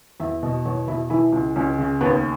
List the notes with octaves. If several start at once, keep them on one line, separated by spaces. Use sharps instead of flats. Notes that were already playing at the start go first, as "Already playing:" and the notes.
E2 E5
B2 D#5
E2 C#5
B2 E4
E3 E4
C#2
C#2 C#4
C#3
D#2 B3